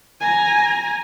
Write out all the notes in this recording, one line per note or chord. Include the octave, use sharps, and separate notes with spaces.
G#5 A#5